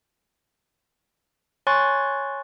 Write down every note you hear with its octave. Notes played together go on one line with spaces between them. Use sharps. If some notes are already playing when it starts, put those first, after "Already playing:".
C#5 G#5 C6 C#6 F#6 A6